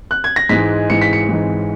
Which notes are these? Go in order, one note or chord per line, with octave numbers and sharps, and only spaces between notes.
F#6
G#6
A#6
G#2 E3 G#3 B6
G#2 E3 G#3 C#7
B6
C#7
G#2 E3 G#3